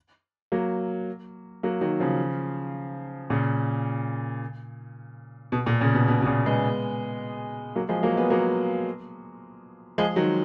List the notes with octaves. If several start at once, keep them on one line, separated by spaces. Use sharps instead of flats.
F#3 A#3
F#3 A#3
D#3 F#3
C#3 F3
A#2 C#3
B2
A#2
A#2 C#3
B2
B2
B2
A#2 C#3
G#3 B3
F#3 A#3
F3 G#3
F#3 A#3
G#3 B3
F#3 A#3
F3 G#3
D#3 F#3